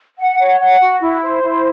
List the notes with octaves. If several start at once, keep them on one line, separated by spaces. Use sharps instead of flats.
F#5
C#5
F#5
F#4
E4
C5
E4